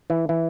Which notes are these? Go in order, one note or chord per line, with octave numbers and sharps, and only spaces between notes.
E3
E3